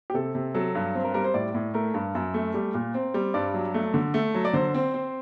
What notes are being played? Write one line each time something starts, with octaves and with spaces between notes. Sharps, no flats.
G4
C3 A4
C3
F#3 A4
G2
C4
A#4
G3 A#4
C5
A2 D5
A2
A3 A#4
G2
F#2
A3
G3
A#2
C4
G3
G2 D5
F#3
A3
D3
A3
F#3
D5
D3 C5
C4
C4